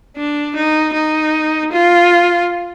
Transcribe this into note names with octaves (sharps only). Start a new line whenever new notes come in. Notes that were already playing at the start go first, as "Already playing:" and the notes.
D4
D#4
D#4
F4